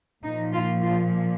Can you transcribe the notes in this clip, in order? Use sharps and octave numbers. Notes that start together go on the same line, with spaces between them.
A#2 F3 D#4
F4
F4